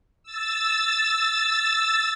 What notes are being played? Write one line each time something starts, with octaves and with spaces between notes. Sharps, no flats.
E6 A6